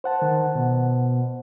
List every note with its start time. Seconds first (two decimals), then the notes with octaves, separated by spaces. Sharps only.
0.04 C5 F#5 A5
0.22 D#3
0.55 B2